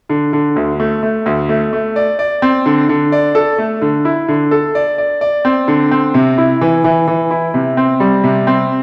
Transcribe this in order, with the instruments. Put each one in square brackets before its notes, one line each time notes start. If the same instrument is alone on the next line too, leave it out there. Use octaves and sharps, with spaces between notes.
[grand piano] D3
D3
D2
A3
A3
D2
A3
A3
D5
D5
C4
D3
D3
D5
A4
A3
D3
E4
D3
A4
D5
D5
D5
C4
D3
C4
C3
E4
E3
E3
E3
E4
C3
C4
G3
C3
C4